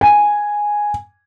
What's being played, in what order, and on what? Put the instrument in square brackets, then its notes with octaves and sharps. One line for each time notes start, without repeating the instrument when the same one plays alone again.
[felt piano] G#5